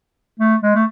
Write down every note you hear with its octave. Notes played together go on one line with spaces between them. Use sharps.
A3
G#3
A3